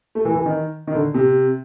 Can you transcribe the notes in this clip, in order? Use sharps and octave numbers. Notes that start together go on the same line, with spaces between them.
A3
E3
E3
D#3
D#3
D3
C3